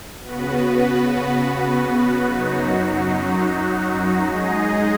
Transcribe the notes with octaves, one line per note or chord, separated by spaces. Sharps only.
C#3 B3 F#4 B4
F#2 F#3 D#4 F#4
G#3 D#4 G#4 D#5